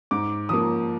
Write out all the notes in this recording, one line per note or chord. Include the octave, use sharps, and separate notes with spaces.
G#2 D6
F3 A#3 D#6